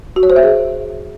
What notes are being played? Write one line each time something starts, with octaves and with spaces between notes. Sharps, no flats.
F#4
C#5
C5
E5
G#4